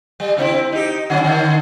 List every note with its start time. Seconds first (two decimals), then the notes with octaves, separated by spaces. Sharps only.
0.20 G3
0.37 C#3 C4 E4
0.72 D#4 G4
1.10 D3 F#3 C#4
1.24 D3 D#3